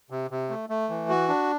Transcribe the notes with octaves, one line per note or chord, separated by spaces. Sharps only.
C3
C3
A3
A3
E3
F#4
D4